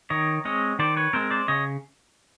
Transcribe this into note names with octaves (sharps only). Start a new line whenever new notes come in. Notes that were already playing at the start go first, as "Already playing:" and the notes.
D#3 C#5 D#5
G#3 C4 C#5 D#5
D#3 C5 D5
B4 C#5
G#3 C4 A#4 C5
C5 D5
C#3 C#5 D#5